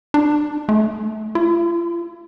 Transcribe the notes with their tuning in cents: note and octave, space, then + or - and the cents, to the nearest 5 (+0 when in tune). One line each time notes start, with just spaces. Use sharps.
D4 +30
A3 -20
F4 -40